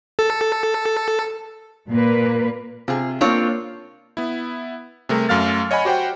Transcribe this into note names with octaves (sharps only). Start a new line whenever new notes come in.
A4
A#2 A#3 B4
C3 F4 G#4
A#3 C4 D4 F4 C#5
B3 E4
C3 G3 A3 G#4 A#4
F#2 A3 F5 F6 A6
C#5 D#5 F#5 G#5 B5
F#4 G4 C5 F#5 G5